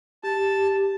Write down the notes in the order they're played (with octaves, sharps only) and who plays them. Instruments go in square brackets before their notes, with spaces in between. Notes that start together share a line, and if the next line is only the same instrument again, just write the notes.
[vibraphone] G4 [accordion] A5